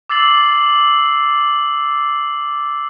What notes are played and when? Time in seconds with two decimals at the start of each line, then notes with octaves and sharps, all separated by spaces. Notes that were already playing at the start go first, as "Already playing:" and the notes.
0.09 D6 E6 A6 C7 F#7